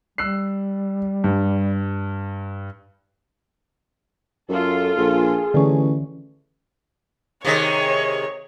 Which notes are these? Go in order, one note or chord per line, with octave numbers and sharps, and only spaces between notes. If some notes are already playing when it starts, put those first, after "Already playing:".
G3 E6 F#6 C7
G2
F#2 F4 A4
A#1 G#4
A1 D3 E3 C#4
C3 D#3 G#3 C#5